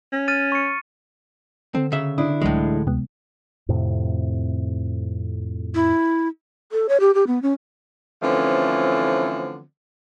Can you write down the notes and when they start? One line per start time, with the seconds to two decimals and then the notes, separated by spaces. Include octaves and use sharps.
0.13 C#4
0.28 F6 A6 D#7
0.52 C#6 C#7
1.75 D3 C4 A4
1.92 C#3 E5
2.18 D4 E4 D#6
2.42 C#2 A2 E3 F#3 G#3
2.87 D2 C3 G#3 B3
3.69 F2 A2 C3
5.75 E4
6.72 A4
6.89 C#5
7.00 G4
7.14 G4
7.27 B3
7.42 C#4
8.22 D3 E3 F3 A3 C4 C#4